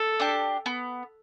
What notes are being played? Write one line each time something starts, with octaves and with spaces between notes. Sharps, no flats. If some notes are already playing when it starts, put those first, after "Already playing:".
Already playing: A4
D4 G4
B3